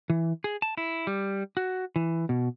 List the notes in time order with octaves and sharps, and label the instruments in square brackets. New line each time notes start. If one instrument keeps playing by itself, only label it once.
[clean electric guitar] E3
G#4
A5
E4
G3
F#4
E3
B2